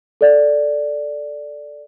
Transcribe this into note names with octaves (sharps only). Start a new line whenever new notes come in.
A4 D5